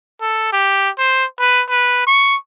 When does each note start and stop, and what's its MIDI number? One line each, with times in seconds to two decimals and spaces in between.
0.21 0.48 69
0.53 0.90 67
0.98 1.25 72
1.39 1.64 71
1.69 2.06 71
2.07 2.36 85